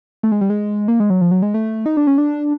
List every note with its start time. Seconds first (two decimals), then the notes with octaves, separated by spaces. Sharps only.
0.23 A3
0.32 G#3
0.41 G3
0.50 G#3
0.88 A#3
1.00 G#3
1.10 F#3
1.21 F3
1.31 F#3
1.42 G#3
1.54 A3
1.86 D#4
1.97 D4
2.07 C#4
2.18 D4